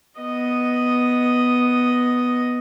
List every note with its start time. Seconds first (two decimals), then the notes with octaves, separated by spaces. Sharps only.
0.21 B3 D#5